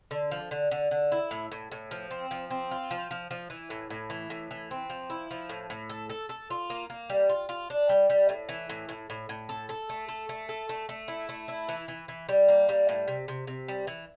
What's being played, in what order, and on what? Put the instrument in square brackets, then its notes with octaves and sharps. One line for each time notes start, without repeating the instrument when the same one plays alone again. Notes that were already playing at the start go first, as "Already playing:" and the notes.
[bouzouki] D3
F3
D3
D3
D3
E4
A2
A2
A2
F3
C4
F3
C4
F4
F3
F3
F3
E3
A2
A2
E3
A2
E3
C4
F3
E4
F3
A2
A2
A4
A4
A4
F4
A#3
A#3
G3
F4
F4
D4
G3
G3
A2
E3
A2
A2
A2
A2
A4
A4
A3
A4
A3
A4
A3
A3
E4
A3
E4
E3
E3
E3
G3
A#3
G3
A2
C3
C3
C3
G3
E3